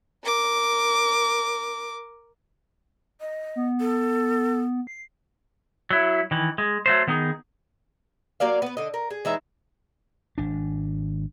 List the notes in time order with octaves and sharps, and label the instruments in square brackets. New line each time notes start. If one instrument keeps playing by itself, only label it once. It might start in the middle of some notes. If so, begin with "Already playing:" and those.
[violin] A#4 D6
[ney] D#5
[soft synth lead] B3
[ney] A4
[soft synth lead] C7
[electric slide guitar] F#3 E4
D#3 E3
G#3
F#3 A3 C5
D#3 B3 D#4 G#4
[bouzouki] F#3 A#3 D5 F5
B3 B4
D3 D#5
A#4
G#4
E3 G#3 D#4 E5
[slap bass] G#1 D4